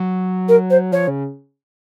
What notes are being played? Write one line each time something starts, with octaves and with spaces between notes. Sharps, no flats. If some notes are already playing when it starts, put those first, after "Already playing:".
Already playing: F#3
A#4
C5
F3 C#5
C#3